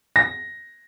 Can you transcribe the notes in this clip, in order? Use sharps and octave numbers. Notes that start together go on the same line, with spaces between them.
A#6